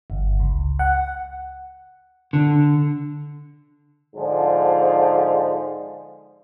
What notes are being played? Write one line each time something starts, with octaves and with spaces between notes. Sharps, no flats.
G1
C#2
F#5
D3
G#2 D3 F3